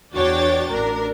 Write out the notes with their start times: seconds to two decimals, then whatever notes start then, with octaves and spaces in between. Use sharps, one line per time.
0.13 E2 D4 F#4 C#5 G5 A6
0.71 A1 D4 A#4